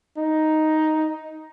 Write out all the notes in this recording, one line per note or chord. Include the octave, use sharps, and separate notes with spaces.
D#4